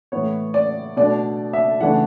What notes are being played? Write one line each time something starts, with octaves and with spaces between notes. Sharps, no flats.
A2 E3 B3 C#5
D5
B2 A3 D4 D5
E5
C#3 E3 A3 D4 F#5